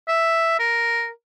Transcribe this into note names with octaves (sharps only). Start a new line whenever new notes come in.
E5
A#4